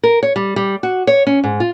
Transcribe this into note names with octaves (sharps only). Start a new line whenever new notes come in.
A#4
C#5
G3
G3
F#4
C#5
C#4
G#2
F4